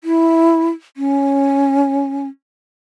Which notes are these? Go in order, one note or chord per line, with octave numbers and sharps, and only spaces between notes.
E4
C#4